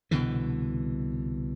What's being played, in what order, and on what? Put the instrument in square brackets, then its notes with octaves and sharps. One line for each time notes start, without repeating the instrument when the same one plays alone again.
[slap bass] C2 B2 D3 E3